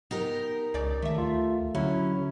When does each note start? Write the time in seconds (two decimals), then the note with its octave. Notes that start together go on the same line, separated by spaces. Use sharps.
0.11 B3 D#4 G4 A#4
0.74 C#2 C#3 D5
1.02 D#3 A3 E5
1.18 D2 F4
1.75 D3 F#3 C#4 E4